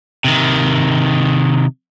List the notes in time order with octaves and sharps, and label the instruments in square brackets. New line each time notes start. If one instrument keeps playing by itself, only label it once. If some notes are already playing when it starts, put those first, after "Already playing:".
[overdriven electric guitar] C3 D#3